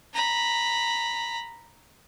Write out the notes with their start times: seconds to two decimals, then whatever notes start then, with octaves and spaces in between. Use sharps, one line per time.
0.14 A#5 B5